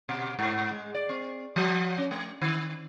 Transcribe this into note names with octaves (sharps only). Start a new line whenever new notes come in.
B2
G#2
G#3
D5
C4
F3
C#4
A3
D#3